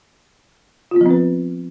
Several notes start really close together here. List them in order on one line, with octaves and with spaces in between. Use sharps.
F4 B3 F3 C4 B4